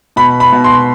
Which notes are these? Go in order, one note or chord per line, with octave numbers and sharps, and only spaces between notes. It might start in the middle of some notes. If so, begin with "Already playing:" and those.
B2 B5
B5
B2
C6